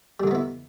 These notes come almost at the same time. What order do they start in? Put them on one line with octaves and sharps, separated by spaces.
G3 D3 D#4 B3 E4